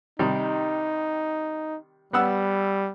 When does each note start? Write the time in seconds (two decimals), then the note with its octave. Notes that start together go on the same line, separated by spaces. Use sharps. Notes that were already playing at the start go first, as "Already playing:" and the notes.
0.19 C3 D#3 G3 D#4
2.13 G3 B3 F#5 E6